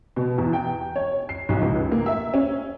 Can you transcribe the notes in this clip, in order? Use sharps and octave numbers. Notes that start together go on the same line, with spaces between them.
B2
E2
G5
C#5
C7
B1
C#2
A#3
E5
C#4